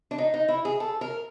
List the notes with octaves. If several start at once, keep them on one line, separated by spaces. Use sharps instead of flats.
D4
D#4
D#4
E4
G#4
A4
A#4